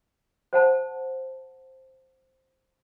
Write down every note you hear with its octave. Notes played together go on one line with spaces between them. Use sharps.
C5 F#5 A5